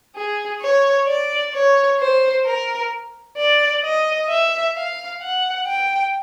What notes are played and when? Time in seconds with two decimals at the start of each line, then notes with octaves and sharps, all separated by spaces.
0.16 G#4
0.61 C#5
1.08 D5
1.54 C#5
1.99 C5
2.46 A#4
3.38 D5
3.84 D#5
4.29 E5
4.76 F5
5.22 F#5
5.68 G5